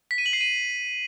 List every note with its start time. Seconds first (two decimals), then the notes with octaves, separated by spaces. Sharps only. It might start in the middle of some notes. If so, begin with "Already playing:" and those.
0.11 B6
0.18 D#7
0.26 F#7
0.33 C7
0.41 D#7